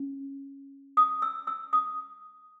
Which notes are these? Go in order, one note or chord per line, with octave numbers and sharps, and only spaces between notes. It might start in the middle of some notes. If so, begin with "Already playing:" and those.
Already playing: C#4
D#6
E6
E6
D#6